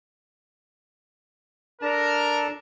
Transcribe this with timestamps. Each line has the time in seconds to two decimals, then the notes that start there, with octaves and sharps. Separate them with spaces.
1.82 D4 A4 A#4 A5